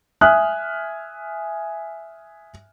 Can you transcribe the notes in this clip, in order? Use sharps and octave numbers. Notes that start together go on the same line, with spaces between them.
E5 G#5 D#6 F6 F#6